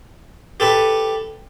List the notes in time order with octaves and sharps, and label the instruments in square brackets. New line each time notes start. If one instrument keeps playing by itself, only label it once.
[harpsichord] G4 A4 B4